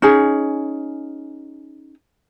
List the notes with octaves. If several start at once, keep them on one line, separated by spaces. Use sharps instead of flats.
C#4 D#4 G#4